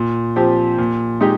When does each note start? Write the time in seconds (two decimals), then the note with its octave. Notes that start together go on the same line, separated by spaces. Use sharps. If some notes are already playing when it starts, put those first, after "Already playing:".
Already playing: A#2
0.36 F3 C4 G4
0.78 A#2
1.21 G#3 D#4 G4